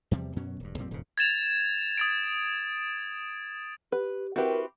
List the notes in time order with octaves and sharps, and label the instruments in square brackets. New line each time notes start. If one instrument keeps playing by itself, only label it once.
[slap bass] E2 C3 F3 G3
F#2 B2 F#3 C#4
E1 G2
A#1 F2 G3 C4
D#1 F2 G#2 C#3
[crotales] G#6 A6 E7 F7
D#6 A6 D7
[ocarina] G4 [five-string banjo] B4
[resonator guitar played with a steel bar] C4 E4 G4 [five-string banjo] F#4 B4 [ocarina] A#4